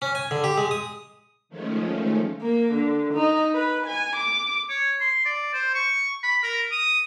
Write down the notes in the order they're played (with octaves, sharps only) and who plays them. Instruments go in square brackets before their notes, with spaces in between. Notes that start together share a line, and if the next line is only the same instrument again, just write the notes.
[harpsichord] C#4
G#5
D3
G4
G#3
D#6
[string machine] D#3 F3 G#3 A3 C#4
[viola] A#3
D3
D#4
B4
G#5
D6
[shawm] C#5
C6
D5
C5
C#6
B5
A#4
D#6